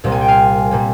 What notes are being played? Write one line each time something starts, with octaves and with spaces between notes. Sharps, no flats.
C2 A#2 G3 A#3
G#5
G5
F5 G#5
A#2 G3 A#3